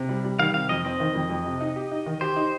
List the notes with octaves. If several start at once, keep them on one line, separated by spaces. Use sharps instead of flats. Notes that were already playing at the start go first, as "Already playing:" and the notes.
Already playing: C3
G3
G3
D#3 F5
C3 F5
F2 D#5
C4 D#5
D#3
F2
F2
C3
D#4
G4
D#4
D#3
G4 C5
D#4